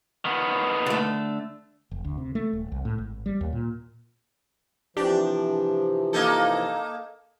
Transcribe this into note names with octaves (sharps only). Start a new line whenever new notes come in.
D#3 B3
D3 A3
F1
D2
C3
A3
D#1
C2
A2
G#1
G3
D#2
A#2
C3 E3 F3 D4 G4
A#3 D#4 A4